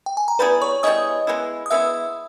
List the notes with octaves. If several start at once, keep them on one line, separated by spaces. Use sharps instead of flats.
G5
G#5
A#5
G3 B3 E4 G#4 B4 B5
C#5 C#6
G3 B3 E4 G#4 D#5 D#6
G#3 B3 E4
D#6
G#3 B3 E4 E5 E6